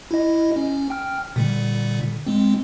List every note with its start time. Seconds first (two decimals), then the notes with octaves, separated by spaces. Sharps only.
0.11 E4 D#5
0.56 C#4
0.90 G5 F6
1.36 A#2 D3 G3
2.27 G#3 C4